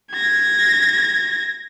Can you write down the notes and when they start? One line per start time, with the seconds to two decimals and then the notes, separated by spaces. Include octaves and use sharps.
0.12 G#6 A#6